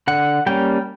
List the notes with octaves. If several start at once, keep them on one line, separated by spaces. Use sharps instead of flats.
D3 F#5
G3 A#3 C#4 G5